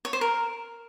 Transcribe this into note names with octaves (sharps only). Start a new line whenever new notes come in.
C#5
C5
A#4